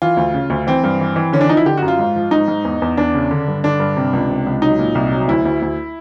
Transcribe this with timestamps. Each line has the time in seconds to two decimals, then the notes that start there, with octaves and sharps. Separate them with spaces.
0.02 E3 F4
0.17 D2
0.34 C#3
0.50 D2
0.67 E3 C4
0.84 G2
1.01 E3
1.16 E3
1.33 D3 C#4
1.41 D4
1.49 F3 D#4
1.57 E4
1.65 D3 G4
1.77 F#2 F#4
1.88 F4
1.99 G#2
2.16 F3
2.31 G#2 D#4
2.48 G#2
2.65 E2
2.82 E2
2.97 E2 D4
3.15 C#3
3.31 D3
3.48 G2
3.64 D3 D4
3.80 G2
3.97 C3
4.13 C#2
4.30 C3
4.47 C#2
4.62 F#3 D#4
4.79 A#2
4.95 C2
5.12 F#3
5.28 D2 E4
5.45 D2
5.62 D2